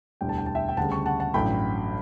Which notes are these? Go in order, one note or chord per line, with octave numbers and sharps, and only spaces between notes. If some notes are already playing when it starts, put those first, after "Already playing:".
E1 D2 D3 G3 G5
A5
G5
A5
E5 G5
G5
D2 C#3 G3 F#5 A5
A5 C#6
F#5 A5
F#5 A5
A1 G2 F#3 A3 G5 B5